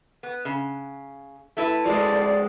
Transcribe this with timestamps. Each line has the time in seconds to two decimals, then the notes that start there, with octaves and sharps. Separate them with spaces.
0.23 B3
0.45 C#3
1.57 A3 E4 B4
1.86 F3 G#3 D5